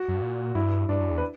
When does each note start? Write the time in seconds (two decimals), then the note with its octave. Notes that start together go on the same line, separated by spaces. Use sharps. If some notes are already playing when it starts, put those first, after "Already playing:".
Already playing: F#4
0.08 F#2
0.15 G2
0.22 A#2
0.55 G2 E4
0.89 G2 D4
1.00 F#2
1.11 E2
1.18 B4